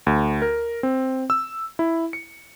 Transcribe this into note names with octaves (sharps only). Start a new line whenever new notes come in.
D2
A#4
C4
E6
E4
C#7